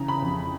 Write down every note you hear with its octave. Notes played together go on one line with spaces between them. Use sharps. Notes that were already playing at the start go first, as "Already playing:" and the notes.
Already playing: C#3 E3 A#5
B5
F2